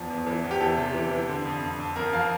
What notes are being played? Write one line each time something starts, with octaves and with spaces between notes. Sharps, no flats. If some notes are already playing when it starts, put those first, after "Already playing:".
Already playing: E2 F3
E2
E3
E2
G4
E3 A4
C3
E3
E3
D3
F2
F2
F2
F2 A#4
F3 F5